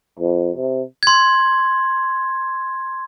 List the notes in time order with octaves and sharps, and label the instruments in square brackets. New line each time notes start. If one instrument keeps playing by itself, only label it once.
[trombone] F2
C3
[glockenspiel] C6 G#6